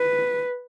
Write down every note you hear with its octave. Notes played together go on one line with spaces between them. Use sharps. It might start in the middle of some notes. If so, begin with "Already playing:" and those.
Already playing: B4